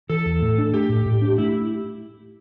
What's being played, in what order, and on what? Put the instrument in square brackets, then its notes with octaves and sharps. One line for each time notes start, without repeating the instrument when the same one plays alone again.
[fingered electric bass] E3 [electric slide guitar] A4
[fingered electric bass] E2
A2
D4
[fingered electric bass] A3 [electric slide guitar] G4
[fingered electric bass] A2
A2
D4
[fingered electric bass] A3 [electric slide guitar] E4